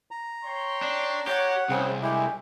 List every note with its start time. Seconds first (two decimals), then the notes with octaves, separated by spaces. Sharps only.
0.11 A#5
0.44 C#5 G5 C6
0.82 D4
1.27 G4 C#5 F#5
1.69 C2 C#3 C4 G#4
2.02 G#3 A3 D4 E4 G4 G#5